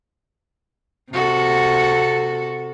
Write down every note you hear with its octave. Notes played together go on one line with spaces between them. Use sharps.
C3 F#4 A4